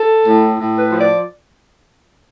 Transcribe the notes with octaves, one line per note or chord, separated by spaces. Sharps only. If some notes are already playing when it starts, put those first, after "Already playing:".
Already playing: A4
A2
A2
B4
F3
D5